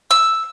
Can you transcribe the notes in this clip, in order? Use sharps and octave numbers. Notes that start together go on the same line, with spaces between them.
E6